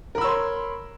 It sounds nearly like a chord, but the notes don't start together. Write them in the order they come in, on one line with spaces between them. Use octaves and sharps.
A#4 B5 E6 C#5 C6